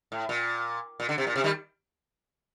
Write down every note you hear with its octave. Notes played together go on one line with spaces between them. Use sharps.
A2
A#2
A#2
D3
C3
A#2
C3
D#3 G3